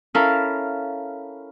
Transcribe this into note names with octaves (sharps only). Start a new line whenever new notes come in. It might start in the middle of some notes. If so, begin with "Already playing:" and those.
C#4 E4 A4 A#4 F5